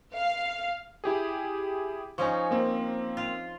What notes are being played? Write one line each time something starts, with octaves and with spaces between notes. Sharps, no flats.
F5
E4 G4 G#4
F3 C#4 D#4 G#5 C#6
A#3 C4
F4